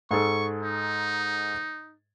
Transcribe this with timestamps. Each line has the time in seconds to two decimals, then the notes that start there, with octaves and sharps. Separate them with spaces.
0.11 G#2 G#4 A4 C#6
0.63 D#4